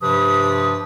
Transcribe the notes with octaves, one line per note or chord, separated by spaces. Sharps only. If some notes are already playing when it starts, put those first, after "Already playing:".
G2 C3 F3 G4 B4 D#6